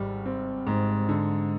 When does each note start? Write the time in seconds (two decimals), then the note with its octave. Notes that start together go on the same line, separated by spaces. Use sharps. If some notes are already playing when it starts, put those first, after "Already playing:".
Already playing: G#1 G3
0.26 C4
0.67 G#2
1.09 D3